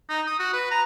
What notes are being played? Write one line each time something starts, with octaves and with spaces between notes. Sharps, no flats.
D#4
D#6
F#4
B4
A#5